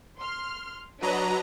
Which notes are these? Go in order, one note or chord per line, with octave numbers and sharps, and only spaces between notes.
C6 F6
F#3 D4 B4 D#5 A#5